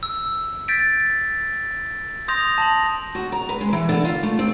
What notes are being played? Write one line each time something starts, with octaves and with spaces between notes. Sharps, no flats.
E6
G6 A6 B6 D7
C6 D#6 G6 A#6 F7
A5 A#6 F#7
F#4
A#5
B4
G#3
E3
D3
F4
A3
C4